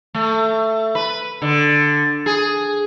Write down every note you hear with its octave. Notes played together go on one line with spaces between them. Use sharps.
A3
B4
D3
G#4